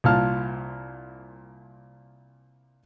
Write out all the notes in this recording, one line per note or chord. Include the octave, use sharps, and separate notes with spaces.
C2 A#2 F4 A5 F6